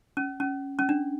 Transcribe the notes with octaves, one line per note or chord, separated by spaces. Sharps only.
C#4
C#4
C#4
D4